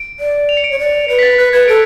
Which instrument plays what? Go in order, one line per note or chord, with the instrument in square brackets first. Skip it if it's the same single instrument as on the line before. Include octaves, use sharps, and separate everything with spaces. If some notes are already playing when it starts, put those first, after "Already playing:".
Already playing: [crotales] D7
[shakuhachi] D5
[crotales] F7
C#7
D7
[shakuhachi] C#5
D5
[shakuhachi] B4 [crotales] C#7
[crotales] B6
A6
[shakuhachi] B4 [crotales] F#6
[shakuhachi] B4 [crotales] G#6
[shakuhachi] A4 [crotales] D7